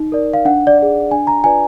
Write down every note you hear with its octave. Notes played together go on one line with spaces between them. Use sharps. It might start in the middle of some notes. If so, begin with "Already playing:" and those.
Already playing: D#4
A#4 D5
F5
D4 F#5
D5
G#4 D5
D4 G#5
A#5
F4 B4 D5 G#5